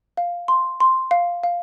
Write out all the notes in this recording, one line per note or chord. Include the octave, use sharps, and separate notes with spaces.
F5
C6
C6
F5
F5